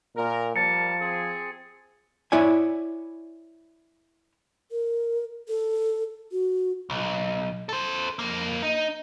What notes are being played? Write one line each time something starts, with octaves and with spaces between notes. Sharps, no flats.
A#2 A#4
F3 G3 A#4 A5 A6 C#7
C4 G#4
E4 C#5 D5 G#5
A#4
A4
F#4
B1
A4 C5
F2 A#3
D#4